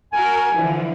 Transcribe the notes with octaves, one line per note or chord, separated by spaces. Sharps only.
F#4 A#4 G#5
D3 E3 F3